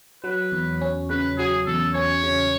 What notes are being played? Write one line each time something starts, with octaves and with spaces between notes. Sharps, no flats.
F#3 B4
E2
C#4
C#3 B4
F#3 G#4
E2 A4
C#4 C#5
C#3